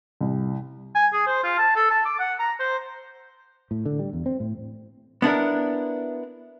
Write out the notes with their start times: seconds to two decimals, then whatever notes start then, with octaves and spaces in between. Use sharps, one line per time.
0.21 C2
0.95 G#5
1.13 G#4
1.27 C5
1.44 F4
1.58 A5
1.76 A4
1.91 A5
2.06 D6
2.19 F#5
2.39 A#5
2.60 C5
3.71 A2
3.86 D3
3.99 G3
4.13 E2
4.26 C4
4.40 A2
5.22 B3 D4 E4 A#4